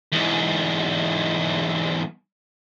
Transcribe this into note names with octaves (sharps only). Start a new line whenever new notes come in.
E2 G#2